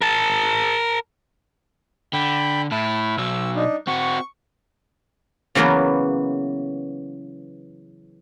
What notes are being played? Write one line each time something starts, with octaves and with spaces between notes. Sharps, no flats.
A#4 A5
D3 G5 B5
A2 E4 A5
B1 F#3 E6
D4 D#4
C4 F#4 C#6
C#3 E3 F#3 A#3 B3